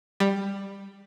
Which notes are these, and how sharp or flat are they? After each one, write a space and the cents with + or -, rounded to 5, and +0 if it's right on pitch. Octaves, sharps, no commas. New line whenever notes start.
G3 +10